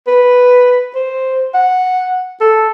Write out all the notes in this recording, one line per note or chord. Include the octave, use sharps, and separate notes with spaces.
B4
C5
F#5
A4